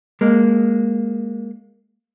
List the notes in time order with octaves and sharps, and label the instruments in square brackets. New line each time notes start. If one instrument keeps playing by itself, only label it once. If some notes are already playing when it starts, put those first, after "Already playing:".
[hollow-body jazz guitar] G#3 A#3